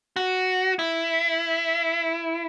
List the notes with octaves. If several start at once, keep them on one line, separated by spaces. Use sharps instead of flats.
F#4
E4